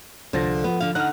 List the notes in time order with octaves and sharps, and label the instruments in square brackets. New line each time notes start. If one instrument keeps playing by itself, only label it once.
[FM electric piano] C2 A6 A#6 [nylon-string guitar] D3 F3
[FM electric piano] C2
[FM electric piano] F3 [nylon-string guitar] B3
[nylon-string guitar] D3 F5
[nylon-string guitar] D3 D#4 F#5 [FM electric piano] F6 F#6